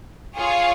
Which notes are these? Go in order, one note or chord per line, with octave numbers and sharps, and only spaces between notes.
F4 G#4 C#5 F5